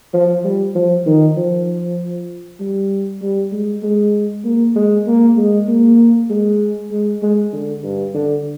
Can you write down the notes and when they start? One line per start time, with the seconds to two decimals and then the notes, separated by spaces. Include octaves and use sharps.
0.13 F3
0.44 G3
0.75 F3
1.06 D#3
1.37 F3
2.60 G3
3.22 G3
3.52 G#3
3.83 G#3
4.45 A#3
4.75 G#3
5.07 A#3
5.37 G#3
5.68 A#3
6.30 G#3
6.91 G#3
7.22 G#3
7.53 D3
7.84 G2
8.14 D3